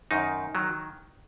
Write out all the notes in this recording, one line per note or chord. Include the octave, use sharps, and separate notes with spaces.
F#2 D#3 D#4
D#3 F#3